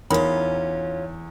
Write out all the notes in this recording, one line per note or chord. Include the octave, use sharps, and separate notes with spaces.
E2 C#4 D#4 F4 A#4 B5